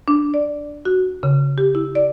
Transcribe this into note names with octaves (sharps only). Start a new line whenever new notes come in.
D4
D5
F#4
C#3
G4
E4
D5